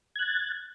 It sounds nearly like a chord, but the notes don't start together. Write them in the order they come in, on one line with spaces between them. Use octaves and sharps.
G#6 F#6 A6